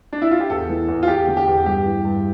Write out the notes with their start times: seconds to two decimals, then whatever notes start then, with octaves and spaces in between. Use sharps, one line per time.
0.13 D4
0.22 E4
0.31 F4
0.40 G4
0.50 E2 A4
0.69 E3
0.88 E2
1.03 F4
1.08 E2 G4
1.28 D3
1.37 G4
1.47 E2
1.66 G2 G4
1.86 E3
2.05 G2